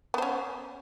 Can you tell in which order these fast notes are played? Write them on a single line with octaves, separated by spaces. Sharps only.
B3 C5 C#4